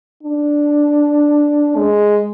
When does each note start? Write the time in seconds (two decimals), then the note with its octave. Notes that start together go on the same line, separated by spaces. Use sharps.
0.23 D4
1.77 G#3